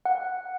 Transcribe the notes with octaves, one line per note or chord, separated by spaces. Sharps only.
F#5